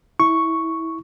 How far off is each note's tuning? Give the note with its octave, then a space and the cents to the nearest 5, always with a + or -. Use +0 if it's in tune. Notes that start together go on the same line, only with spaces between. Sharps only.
E4 -20 C#6 +0